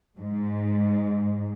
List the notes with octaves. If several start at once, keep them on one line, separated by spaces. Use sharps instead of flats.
G#2